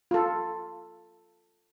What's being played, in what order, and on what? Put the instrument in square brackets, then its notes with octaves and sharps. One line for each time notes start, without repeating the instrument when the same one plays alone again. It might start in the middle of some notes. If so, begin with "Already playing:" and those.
[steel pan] F4 A4